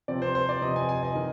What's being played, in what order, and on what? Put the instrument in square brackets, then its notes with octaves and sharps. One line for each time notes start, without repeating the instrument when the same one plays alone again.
[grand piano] C3 F3 C4 D5
C5
C5
D5
C3 F3 C4 D#5
G#5
G#5
D#5
D#3